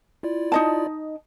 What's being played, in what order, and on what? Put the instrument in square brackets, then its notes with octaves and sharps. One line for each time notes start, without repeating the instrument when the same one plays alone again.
[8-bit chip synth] E4 F4 D5
[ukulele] D#4 D#5 A5